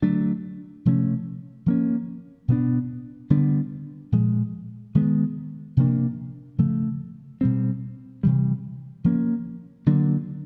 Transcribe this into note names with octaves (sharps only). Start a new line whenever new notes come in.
D3 F#3 A3 D4
C3 F3 A3 C#4
F3 A#3 C#4
B2 G#3 B3 D4
D3 G3 B3 D4
A#2 F3 G#3
D#3 G#3 B3
C3 F3 A#3 D4
C#3 F3 A3
B2 G3 C4
C3 E3 G3
F3 A#3 C#4
D3 F#3 A#3 D4